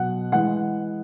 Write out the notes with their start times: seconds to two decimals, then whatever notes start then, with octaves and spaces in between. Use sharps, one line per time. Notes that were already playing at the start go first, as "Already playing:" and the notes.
Already playing: B2 F#3 F#5
0.32 E3 G#3 F#5